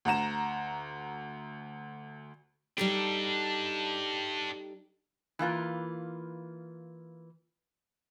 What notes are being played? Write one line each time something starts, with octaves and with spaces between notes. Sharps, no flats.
D2 F#5 A#5 E7
G3 D4 D#4 G4 A4
E3 A#3 F4 B4